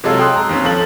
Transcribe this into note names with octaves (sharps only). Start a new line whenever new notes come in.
C3 F#3 G#3 F4 A4 E6
G5 C6 D#6 E6 F#6
A#5
D#2 C4 C#4
F3 A4 F#7